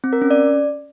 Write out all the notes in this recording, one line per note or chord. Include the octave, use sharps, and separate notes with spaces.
C4
A#4
C#4
D5